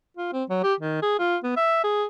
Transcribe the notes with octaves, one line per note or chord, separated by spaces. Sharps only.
F4
C4
F#3
G4
D#3
G#4
F4
B3
E5
G#4